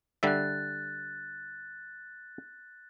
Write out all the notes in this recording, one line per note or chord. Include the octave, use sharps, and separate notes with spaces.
D3 G3 E5 F#6 A6